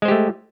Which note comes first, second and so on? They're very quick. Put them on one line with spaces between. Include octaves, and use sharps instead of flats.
G#3 C5 G4 A3